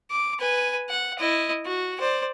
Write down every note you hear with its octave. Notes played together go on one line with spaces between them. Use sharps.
D6
B4 G#5
F#5
E4 D#5
F#4
C5 D5